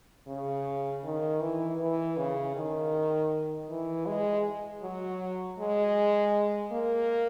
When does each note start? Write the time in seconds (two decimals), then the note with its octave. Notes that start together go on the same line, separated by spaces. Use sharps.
0.28 C#3
1.04 D#3
1.41 E3
1.80 E3
2.18 C#3
2.56 D#3
3.70 E3
4.06 G#3
4.83 F#3
5.59 G#3
6.72 A#3